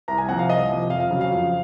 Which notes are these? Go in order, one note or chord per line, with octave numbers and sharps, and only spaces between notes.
C2 A#5
G#5
C3 F3 C4 F#5
F5
C2 D#5
C3 F3 C4
F2 F5
F5
C#3 F#3
F5
F2